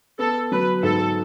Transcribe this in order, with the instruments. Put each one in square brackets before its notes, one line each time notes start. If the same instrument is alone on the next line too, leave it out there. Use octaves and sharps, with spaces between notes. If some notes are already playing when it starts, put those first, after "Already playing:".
[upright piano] B3 [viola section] A4
[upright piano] F#3 [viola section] B4
[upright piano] G#2 [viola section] A4